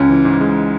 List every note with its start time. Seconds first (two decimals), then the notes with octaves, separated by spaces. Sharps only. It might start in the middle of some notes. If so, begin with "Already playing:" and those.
Already playing: C#2 C#4
0.09 E3
0.25 G#2
0.41 G#3